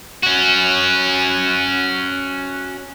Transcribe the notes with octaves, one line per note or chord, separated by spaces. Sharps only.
C#4 F#4